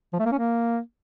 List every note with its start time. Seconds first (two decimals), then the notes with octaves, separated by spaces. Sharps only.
0.13 F3
0.19 A3
0.26 A#3
0.32 C#4
0.39 A#3